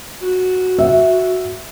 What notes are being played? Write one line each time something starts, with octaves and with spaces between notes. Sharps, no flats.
F#4
E5